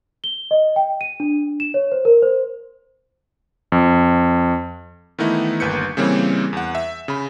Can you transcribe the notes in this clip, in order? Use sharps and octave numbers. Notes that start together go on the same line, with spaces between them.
G7
D#5
G5
D#7
D4
E7
C#5
C5
A#4
C5
F2
D#3 E3 A3 B3 D#4 E4
G1 D#2 B4 G6 C#7
C#3 E3 G3 A#3 C4 C#5
E2 F#5
E5
C#3 B5